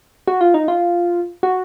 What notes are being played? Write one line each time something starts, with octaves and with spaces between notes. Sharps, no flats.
F#4
F4
D#4
F4
F#4